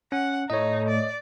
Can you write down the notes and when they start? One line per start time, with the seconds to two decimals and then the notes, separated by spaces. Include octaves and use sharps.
0.12 C#4 F#5
0.50 A2 A3 D#4 C#5 D#5
0.88 D5